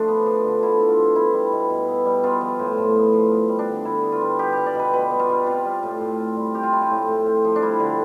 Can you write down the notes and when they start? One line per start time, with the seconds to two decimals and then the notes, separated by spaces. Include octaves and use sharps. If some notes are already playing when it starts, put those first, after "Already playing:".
Already playing: F3 A3 D4
0.08 B3
0.26 F3
0.44 D3
0.62 D3 E4
0.80 B3
0.88 F4
0.97 F3
1.15 B3 E4
1.34 G3
1.52 B2
1.70 B2
1.88 B3
2.06 G3
2.24 B3 F4
2.41 F3
2.59 A2
2.77 A2
2.96 B3
3.13 F3
3.31 B3
3.49 G3
3.59 D4
3.68 D3
3.85 D3 E4
4.03 B3
4.12 F4
4.21 G3
4.39 B3 G4
4.53 G3 G4
4.66 D5
4.75 B2 B4
4.93 B2 B4
5.10 B3
5.19 F4
5.29 G3
5.46 C4 F4
5.65 G3
5.83 A2
6.00 A2
6.19 C4
6.37 G3
6.54 C4 G4
6.63 F4
6.73 F3 E4
6.82 F4
6.90 A2
7.08 A2
7.26 C4
7.45 F3
7.56 D4
7.62 G3 E4
7.80 D3